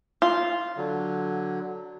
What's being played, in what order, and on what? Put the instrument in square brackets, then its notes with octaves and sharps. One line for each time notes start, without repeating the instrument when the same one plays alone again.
[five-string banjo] F4
[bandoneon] D3 F#3